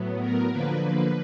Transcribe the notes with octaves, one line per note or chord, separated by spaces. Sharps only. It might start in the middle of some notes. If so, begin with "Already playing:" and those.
Already playing: A2 F#3 B3
A#4
D3 F3 A#3 B4
B4